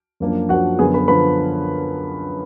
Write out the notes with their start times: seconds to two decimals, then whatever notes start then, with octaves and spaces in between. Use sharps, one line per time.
0.20 F#2 F3 A#3 D4
0.49 F#2 F3 A#3 D4 F#4 F#5
0.79 F#2 D3 F3 B3 G#4 G#5
0.94 B4 B5
1.08 D3 F3 B3 B4 B5